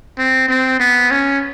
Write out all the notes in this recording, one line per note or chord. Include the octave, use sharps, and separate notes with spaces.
C4
C4
B3
C#4